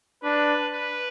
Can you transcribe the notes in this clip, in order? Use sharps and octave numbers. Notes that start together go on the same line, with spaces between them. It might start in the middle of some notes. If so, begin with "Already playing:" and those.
D4 B4
B4